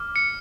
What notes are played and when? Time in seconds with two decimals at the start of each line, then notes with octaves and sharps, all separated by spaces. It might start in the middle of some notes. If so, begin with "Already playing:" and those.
Already playing: D6 F6
0.16 C#7